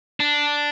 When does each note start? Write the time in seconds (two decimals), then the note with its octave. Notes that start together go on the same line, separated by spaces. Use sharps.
0.20 D4